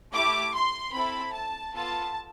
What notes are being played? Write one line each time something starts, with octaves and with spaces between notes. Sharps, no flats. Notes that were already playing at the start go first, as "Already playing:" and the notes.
A3 E4 G4 D6
C6
C4 E4 A4 B5
A5
B3 F4 A4 A5